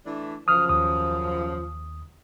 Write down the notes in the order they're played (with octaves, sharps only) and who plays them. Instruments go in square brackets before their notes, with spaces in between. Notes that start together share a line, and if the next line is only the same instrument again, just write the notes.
[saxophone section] E3 A3 D4
[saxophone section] F#2 C#3 F3 [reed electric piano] D#6 F6
[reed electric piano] D#2 D#6